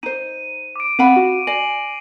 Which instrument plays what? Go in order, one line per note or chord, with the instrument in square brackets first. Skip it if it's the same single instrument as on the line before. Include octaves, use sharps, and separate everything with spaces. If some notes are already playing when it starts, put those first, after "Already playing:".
[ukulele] D#4 C5 [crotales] D#7
[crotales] D6 D7
[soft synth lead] C4 [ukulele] F5 F#5 B5 [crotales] D#7
[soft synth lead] F#4
[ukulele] D5 [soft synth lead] G#5 [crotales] A#6 C7 F#7